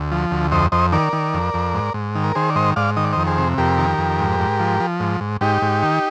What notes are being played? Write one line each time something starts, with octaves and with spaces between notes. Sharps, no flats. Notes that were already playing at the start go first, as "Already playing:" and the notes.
Already playing: D2
F3
D2
F2 C5 D#5
F2 C5 D#5
D#3 A#4 D5
D#3
F2
F2
G#2
G#2
D#3
A#4
D#3 G#4 C5
D5
G#2 C5 D#5
G#2 D5 F5
D#3 D#5
D5
F2 C5 D#5
G#4 C5
C3
F2 G4 A#4
D#3
F2
G#2
G#2
F3
F3
G#2
G#2
G#2 D#4 G4
G#2
D#3